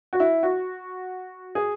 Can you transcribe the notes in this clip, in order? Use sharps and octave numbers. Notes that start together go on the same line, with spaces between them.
F#4
E4
F#4
G#4